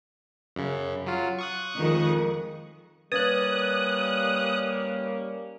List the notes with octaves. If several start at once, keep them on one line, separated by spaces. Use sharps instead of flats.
F#2 C#3
F#3 F4
C#6 D#6 F#6
F2 D#3 G#3
G3 A#3 C#4 B4 D#6 F#6 G#6 A6